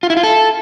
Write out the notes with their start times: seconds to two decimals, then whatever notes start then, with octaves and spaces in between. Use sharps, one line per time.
0.03 F4
0.10 E4
0.17 F4
0.23 A4